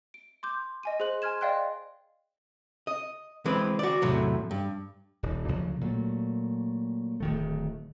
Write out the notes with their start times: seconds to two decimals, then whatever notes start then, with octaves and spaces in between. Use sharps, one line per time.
0.14 D7
0.43 C6 D6 G6
0.83 D#5 G#5 D#7
1.00 G#4 C5 C6 F#6 F#7
1.22 G#5 C6 F6 G#6 E7
1.41 D5 D#5 F5 G5 C6 F#6
2.87 D#5
3.45 E3 G#3 C4 B4
3.79 F#4 D5
4.02 E2 A2 C3 F#3
4.51 G2
5.23 D#1
5.48 D2 C#3 F3 F#3
5.81 A#2 F#3 A3
7.20 D1 D#3 A3